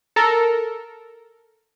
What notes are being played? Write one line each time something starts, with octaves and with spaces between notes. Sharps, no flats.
A4 A#4